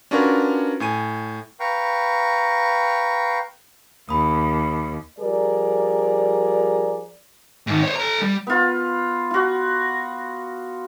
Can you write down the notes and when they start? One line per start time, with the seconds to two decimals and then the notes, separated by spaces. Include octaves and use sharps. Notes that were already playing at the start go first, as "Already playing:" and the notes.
0.11 C#4 D4 F4 F#4 A#4 B4
0.80 A2 G#5 D#7
1.60 B4 F5 G5 A#5 C#6
4.09 D#2 B5 D#6
5.19 F3 G3 G#4 A#4 D5
7.67 G#2 D#3
7.82 C5 C#5
7.96 A4 A#5
8.22 G3
8.47 B3 F4
9.31 F4 F#4